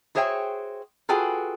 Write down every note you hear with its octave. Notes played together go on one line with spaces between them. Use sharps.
F#4 G#4 C5 C#5 E5 G5
F4 F#4 G#4 A4 B4 G5